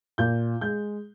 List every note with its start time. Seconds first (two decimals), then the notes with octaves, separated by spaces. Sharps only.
0.18 A#2 G6
0.61 G#3 G6